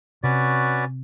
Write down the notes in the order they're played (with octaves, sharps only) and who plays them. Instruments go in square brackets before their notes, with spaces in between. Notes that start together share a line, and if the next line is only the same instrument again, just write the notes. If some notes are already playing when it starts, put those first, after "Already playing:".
[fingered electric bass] C3 [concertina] C#4 F#4 B4 D5